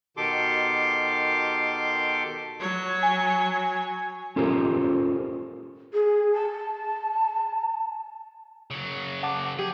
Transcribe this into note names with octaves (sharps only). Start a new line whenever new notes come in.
B2 D#3 G4 A4 C6 D6
F#3 C#5
G#5
C#4 F4 G4 A4 A#4 C5
G#4
A5
C#3 F#3
F#5 A5 D6
G4 G#4